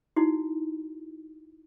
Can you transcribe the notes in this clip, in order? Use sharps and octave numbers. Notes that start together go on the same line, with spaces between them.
D#4 E4 F#4